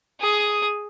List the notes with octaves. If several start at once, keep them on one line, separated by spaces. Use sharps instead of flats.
G#4 D#6